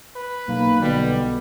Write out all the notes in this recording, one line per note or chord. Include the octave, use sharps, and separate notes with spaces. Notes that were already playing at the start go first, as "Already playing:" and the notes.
B4
B1 A#3
B2 D3 G3